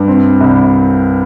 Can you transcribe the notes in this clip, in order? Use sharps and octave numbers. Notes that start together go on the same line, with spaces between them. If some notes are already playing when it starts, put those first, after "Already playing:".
Already playing: G2
C4
C2